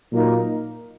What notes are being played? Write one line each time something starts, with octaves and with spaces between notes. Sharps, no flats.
A#2 F#3 A#3 D#4 A#4